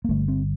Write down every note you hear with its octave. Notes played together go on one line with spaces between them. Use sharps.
A#3
G1 G2 D3 A3
C4